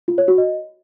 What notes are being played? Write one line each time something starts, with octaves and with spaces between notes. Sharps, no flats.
F4
C#5
F#4
D#5